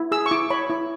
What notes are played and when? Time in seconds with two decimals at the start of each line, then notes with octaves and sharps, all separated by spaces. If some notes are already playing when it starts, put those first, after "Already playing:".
Already playing: E4
0.12 G#4 E6
0.26 C#6
0.31 E4 D6
0.50 C#5 B5
0.70 E4